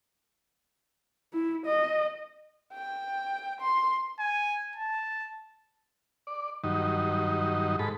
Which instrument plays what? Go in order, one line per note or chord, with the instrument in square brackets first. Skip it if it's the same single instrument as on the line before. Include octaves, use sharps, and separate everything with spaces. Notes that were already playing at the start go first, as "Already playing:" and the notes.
[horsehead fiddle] E4
D#5
[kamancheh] G5
C6
[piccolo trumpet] G#5
A5
[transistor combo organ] D5
G2 D#3 F#3 D#4
G#2 A4 B5